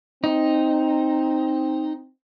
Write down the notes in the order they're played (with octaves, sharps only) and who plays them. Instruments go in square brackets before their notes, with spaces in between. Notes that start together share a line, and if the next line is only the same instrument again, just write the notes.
[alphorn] C4 [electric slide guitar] D#4